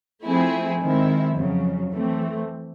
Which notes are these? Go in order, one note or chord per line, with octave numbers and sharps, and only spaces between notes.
F3 A3 C4 E4 G#4
D#3 G#3 C4 E4
F2 C#3 F#3
E3 A3 C4